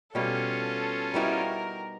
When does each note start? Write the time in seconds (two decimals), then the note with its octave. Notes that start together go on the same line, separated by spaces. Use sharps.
0.15 B2 G3 C#4 F4 A4
1.14 G3 B3 D#4 E4 F#4 G4 A#4